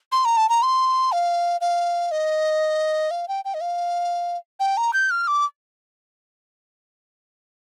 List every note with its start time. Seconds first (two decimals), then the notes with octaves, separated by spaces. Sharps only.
0.12 C6
0.25 A#5
0.37 A5
0.49 A#5
0.62 C6
1.12 F5
1.61 F5
2.11 D#5
3.11 F5
3.28 G5
3.45 G5
3.54 D#5
3.61 F5
4.60 G5
4.77 A#5
4.93 G6
5.10 F6
5.27 D6